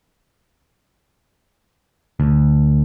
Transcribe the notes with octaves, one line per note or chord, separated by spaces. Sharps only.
D2